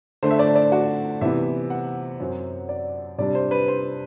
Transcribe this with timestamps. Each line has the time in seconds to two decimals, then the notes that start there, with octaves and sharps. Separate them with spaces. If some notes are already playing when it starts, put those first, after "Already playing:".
0.23 D3 A3 D4 C5
0.31 E5
0.39 D5
0.55 D5
0.72 F#4
1.21 C3 E3 B3 E5
1.70 F#5
2.20 F#2 F#3 C4
2.69 D5
3.18 C3 G3 D4 D5
3.35 C5
3.51 B4
3.68 C5